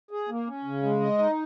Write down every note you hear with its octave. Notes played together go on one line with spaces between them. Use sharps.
G#4
A#3
C#4
C#3
G#3
D#5
D#4